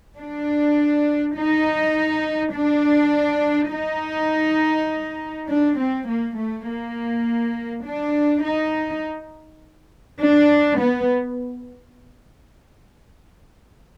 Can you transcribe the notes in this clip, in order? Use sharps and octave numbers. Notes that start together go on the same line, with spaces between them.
D4
D#4
D4
D#4
D4
C4
A#3
A3
A#3
D4
D#4
D4
B3